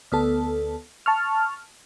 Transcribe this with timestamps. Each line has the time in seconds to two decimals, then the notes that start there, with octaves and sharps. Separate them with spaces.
0.12 D2 B3 A4
1.06 A5 C#6 F6